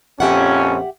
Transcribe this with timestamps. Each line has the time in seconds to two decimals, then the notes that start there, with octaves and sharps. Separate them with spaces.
0.20 A#1 F2 C#4 G4 E5 F#5